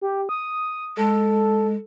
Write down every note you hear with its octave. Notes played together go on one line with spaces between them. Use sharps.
G4
D#6
G#3 A4